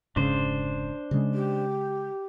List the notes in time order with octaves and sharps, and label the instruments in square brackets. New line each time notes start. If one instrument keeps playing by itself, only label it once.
[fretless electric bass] F1 G#2 C#3 [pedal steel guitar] D4 C5
[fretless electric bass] C#3 G#3
[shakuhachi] G4